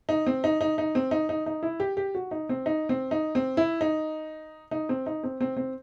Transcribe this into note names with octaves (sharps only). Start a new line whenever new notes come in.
D#4
C4
D#4
D#4
D#4
C4
D#4
D#4
D#4
E4
G4
G4
F#4
D#4
C4
D#4
C4
D#4
C4
E4
D#4
D#4
C4
D#4
C4
C4
C4